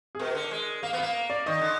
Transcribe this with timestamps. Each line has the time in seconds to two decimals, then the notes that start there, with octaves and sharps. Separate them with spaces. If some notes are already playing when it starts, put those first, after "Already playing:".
0.15 G#4
0.19 B2 A#4
0.35 D3
0.51 G#3
0.83 A#3 F5
0.93 B3
0.98 A#3 F5
1.30 D5
1.46 D#3 D#5
1.62 D3